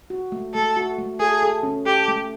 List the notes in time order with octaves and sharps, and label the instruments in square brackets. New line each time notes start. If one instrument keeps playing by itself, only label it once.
[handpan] F#4
A3
[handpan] A3 [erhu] A4
[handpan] F#4
A3
[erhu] G#4 [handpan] A4
[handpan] A4
C#4
[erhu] G4 [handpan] A4
[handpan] A3